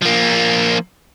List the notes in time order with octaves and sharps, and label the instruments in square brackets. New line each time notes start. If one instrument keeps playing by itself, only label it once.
[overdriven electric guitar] F3 A#3